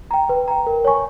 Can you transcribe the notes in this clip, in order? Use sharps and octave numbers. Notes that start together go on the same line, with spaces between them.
G5 A#5
B4
G5 A#5
A#4
C#5 G#5 C#6